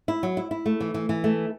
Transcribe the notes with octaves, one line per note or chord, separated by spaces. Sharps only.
E4
F#3
E4
E4
A3
E3
E3
E3
A3